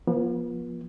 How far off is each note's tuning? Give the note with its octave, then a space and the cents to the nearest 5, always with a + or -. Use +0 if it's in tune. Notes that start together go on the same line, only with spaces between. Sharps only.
F3 +0 B3 -45